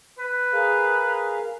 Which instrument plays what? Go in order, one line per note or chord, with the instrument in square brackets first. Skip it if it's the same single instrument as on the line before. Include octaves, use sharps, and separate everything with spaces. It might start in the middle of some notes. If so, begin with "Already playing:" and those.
[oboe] B4
[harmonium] G#4 A#4 F5